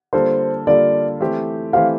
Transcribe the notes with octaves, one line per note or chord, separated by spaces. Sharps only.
D3 G3 A#3 F4 A4 C5
D3 G3 A#3 F4 A4 D5
E3 A3 C4 G4 C5
E3 A3 C4 G4 C5 F5